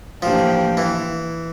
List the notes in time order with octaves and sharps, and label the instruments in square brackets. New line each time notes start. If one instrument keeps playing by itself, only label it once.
[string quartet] A2 E3 A#3 D4 G4 [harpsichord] F3
[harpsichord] E3